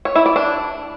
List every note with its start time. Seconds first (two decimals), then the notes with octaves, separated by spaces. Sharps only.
0.05 C#5
0.15 E4
0.26 D5
0.36 D4